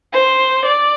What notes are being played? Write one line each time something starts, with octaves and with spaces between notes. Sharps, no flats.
C5
D5